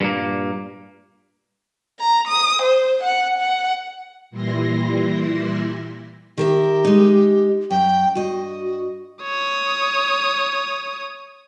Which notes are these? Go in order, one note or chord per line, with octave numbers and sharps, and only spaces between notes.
G2 A#2 A#3
A#5
D#6
C5
F#5
F#5
A#2 E3 G3 E4 C6 A#6
D#3 G4 A#4 E5
G#3 D#4
F#2 G5
G2 F#4 D#5
C#5 D#6